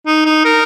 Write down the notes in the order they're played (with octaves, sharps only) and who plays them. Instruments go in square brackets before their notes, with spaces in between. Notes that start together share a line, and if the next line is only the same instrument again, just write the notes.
[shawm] D#4
D#4
A#4